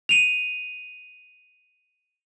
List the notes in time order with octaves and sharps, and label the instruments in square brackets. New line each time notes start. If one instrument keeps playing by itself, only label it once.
[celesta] D#7 F7